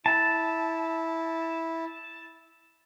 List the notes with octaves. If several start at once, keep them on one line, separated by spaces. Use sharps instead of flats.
E4 A5